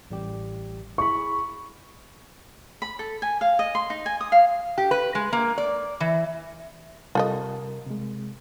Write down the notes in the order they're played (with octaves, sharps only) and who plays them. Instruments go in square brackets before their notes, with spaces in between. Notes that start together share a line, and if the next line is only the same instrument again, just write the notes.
[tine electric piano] A1 G3 G4
[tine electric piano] E4 G#4 B5 [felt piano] C#6
[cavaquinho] B5
A4
G#5
F5
D#5
C6
D#4
G#5
D#6
F5
[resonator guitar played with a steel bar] G4
B4
G#3
A#3
D5
E3
[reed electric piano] C3 G3 A#4 [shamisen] F4 A4 D#5
[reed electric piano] C3 G#3